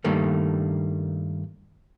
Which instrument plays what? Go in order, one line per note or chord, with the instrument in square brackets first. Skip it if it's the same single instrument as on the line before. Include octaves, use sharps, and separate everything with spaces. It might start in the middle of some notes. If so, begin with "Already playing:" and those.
[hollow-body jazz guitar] G2 D#3 G3 A3 A#3